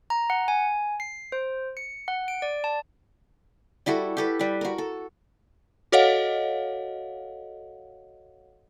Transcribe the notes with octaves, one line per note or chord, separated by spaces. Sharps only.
A#5
F#5
G#5
C7
C5
C#7
F#5
D7
D5
A5
G3 E4 F#4 A4
G4 A4 B4
G3 B4
F#4 A#4
A4
F#4 A4 C#5 D#5 F5 F#5